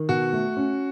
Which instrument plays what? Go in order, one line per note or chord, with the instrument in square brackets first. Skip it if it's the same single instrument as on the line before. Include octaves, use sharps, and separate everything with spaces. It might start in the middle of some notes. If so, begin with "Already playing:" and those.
Already playing: [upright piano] D#3
[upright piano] B2 [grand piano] F#4
[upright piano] A3
C#4